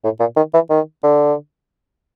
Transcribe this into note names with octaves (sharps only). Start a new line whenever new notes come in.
A2
A#2
D#3
E3
D#3
D3